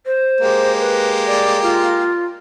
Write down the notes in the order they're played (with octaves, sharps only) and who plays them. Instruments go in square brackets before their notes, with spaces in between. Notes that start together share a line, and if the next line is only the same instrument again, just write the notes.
[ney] C5
[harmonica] G#3 A#3 G4
[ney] B4
D5
F4